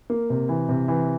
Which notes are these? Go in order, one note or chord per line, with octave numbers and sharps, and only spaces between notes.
A#3
C3
E3
C3
E3